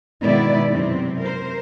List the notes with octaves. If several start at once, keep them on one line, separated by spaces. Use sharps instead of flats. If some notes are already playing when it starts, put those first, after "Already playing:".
B2 D#3 G#3 B3 E4 D5
F#2 C3 C4
A#4 C5